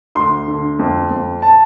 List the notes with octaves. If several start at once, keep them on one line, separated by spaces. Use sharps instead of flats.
D2 C6
D3
F2
F2
A5